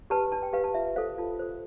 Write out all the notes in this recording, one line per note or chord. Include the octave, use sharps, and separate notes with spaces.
G4 B4 A5
D4 A5
G5
G4 B4 F5
A5
F4 E5
A4 C5 F5
F4 A5
A4 C5